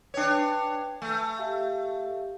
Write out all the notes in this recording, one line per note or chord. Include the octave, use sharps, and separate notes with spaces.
D4 B4 C#5 G5
A3 G#5
G4 E5 F5